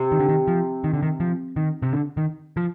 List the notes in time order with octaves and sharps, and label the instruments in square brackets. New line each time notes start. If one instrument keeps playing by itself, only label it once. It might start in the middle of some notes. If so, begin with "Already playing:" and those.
Already playing: [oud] C3
[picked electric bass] D#3
D3
D#3
F3
D#3
D3
D#3
F3
D#3
C3
D3
D#3
F3